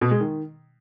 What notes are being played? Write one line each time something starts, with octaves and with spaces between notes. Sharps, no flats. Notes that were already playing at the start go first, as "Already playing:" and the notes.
B2
G#3
D#3